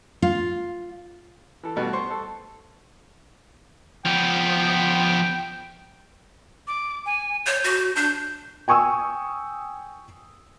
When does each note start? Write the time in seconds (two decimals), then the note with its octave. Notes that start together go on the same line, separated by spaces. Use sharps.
0.22 F4
1.63 E3 A4
1.76 G2 B2 A3
1.93 C5 C#6
2.10 A4
4.05 F3 B3 G5
6.67 D6
7.06 G#5
7.47 C#5 G6
7.64 F#4
7.96 D4 G6
8.68 G5 G#5 C#6 D#6 E6